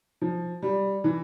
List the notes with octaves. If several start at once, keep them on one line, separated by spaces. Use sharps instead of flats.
F3
G3
E3